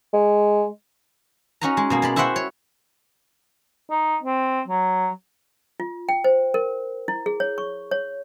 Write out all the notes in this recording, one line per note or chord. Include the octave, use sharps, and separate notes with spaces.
G#3
C#4 D#4 F#4 D#5 A#5
G#3
B2 A#3 G#4
G#3 D5 B5
E4 F#4 C5 E5 F#5 G5
C#5
D#4
C4
F#3
F4
G5
C5
A#4
E4
G#4
C#5
C#6
C#5